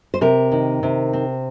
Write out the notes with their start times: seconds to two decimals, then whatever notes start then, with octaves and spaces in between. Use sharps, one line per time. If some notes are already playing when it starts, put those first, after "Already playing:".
0.14 C5
0.21 C3 A#4
0.52 D#3
0.83 C3
1.13 C4